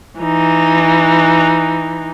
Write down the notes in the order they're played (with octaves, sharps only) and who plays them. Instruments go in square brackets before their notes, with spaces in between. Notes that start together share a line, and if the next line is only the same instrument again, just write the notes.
[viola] E3 D#4